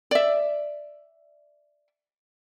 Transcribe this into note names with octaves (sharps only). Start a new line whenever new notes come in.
D5 E5